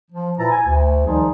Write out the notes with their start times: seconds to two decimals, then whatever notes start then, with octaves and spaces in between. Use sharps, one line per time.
0.11 F3
0.37 A#2 E4 B4 A5 A#5
0.51 G#5
0.66 D2
1.06 D#3 F3 G3 D#4 G#4